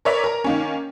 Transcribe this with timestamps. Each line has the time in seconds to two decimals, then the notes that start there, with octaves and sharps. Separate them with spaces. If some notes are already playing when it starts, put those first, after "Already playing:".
0.05 A#4 B4 C#5 D5 E5
0.24 A#4 A#5
0.44 D#3 A#3 C#4